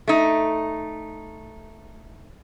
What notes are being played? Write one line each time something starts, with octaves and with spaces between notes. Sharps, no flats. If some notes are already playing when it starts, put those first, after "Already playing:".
A3 D#4